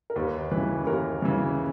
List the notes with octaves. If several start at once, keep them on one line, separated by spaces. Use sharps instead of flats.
A#4
D#2 B4
C#3 E3 B4
D#2 A#4
C#3 E3